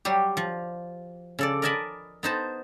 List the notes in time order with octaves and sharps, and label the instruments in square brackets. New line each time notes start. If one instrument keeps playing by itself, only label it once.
[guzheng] F#3 G3 G4
F3
C#3 A4 D5
A#4 D5 D#5 G#5 A5 B5
B3 D#4 C5 A5